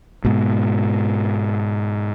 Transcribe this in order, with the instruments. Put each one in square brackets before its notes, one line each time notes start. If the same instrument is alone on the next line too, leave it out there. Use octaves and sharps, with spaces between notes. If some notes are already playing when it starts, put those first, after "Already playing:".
[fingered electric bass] G#2 B2